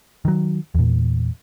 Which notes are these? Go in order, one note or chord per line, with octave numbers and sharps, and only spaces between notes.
D#3 F#3
E2 A#2